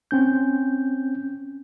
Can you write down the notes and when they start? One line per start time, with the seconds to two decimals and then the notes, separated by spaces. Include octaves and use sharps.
0.11 C4 C#4 G6